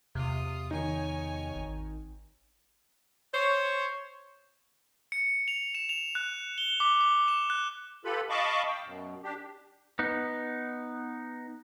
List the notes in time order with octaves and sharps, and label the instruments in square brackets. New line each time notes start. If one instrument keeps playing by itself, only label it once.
[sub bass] E2 [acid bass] C3 [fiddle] F4 D#6
[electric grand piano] D#3 D#4 [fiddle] C#5 G#5
[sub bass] G#1
[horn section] C5 C#5
[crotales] C#7
F7
E7
F7
F#6
G7
D6
D6
E7
F#6
[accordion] F4 G4 A4 B4 B5
D#5 F5 A5 B5 C#6 D6
F5 G5
F#2 B2
D4 G4
[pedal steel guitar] B3 D#4